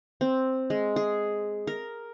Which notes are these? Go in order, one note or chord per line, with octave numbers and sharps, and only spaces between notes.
C4
G#3
G#4
A#4